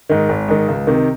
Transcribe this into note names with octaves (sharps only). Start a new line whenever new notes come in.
G#2 D#3
G#1
G#2 D#3
C#2
C3 D#3